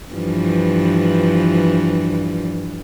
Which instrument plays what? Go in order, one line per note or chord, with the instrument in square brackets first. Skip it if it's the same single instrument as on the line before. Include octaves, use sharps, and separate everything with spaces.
[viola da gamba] G2 E3 F3